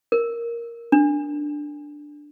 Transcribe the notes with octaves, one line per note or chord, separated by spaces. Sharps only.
A#4
D4